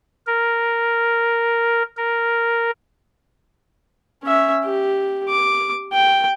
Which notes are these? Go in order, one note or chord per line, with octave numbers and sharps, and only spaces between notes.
A#4
A#4
C#4 E5
G4
D6
G5